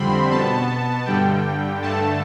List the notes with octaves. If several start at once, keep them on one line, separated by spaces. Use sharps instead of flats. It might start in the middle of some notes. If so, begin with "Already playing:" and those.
Already playing: F2 D3 G3 C4 B5 C6
B2 B3 A5
G2 D3 G3 G5
G2 D3 A3 A5